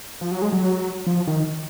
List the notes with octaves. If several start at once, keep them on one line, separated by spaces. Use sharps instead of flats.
F3
F#3
G#3
F#3
F3
D#3